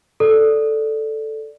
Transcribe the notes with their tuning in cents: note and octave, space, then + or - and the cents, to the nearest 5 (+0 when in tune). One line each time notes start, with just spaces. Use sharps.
A4 +0 D5 +0